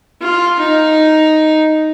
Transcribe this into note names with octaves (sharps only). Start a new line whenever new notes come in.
F4
D#4